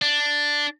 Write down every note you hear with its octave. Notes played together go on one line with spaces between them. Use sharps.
D4